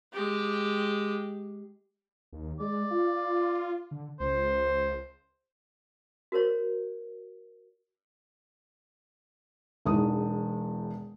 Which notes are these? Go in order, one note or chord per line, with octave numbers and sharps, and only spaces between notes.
G#3 G4
D#2
G#3 D5
F4
D3
C#2 C5
F#4 A#4 C5 C#5
E1 E2 D#4 D#6